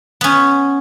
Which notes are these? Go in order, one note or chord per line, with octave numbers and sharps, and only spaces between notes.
B3 C#4